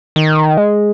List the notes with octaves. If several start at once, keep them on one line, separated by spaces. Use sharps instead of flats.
D#3
G#3